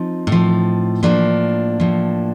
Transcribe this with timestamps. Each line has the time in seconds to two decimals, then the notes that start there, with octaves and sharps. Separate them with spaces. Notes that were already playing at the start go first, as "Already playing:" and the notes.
Already playing: F3 C4 D#4
0.27 A2
0.32 F3
1.03 A2 F3 A#3 D4
1.80 A2 F3